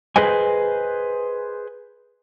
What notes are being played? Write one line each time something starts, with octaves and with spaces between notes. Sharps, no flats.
G#4 B4 C5 D#5 G#5